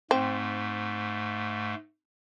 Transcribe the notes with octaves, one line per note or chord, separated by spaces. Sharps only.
G#2 A3 C4